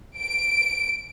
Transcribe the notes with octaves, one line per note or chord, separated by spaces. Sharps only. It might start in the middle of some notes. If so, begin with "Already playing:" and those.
D7